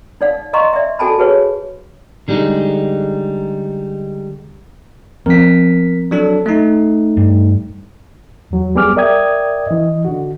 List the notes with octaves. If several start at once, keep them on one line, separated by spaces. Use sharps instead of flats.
D#4 D5 F5
D#5 F5 A#5 C6 C#6
D5 E5
F#4 A4 G#5 A5 B5
F#4 G#4 B4 C#5
D3 G3 G#3 D#4
F3 B3 C4 A#4 B6
F#3 D4 A4
A3 D#4
G2
E2 F#3
G3 B3 G#4 D6 F6
A#4 D5 E5 G5 D#6 G#6
E3 D#5
D3 F#4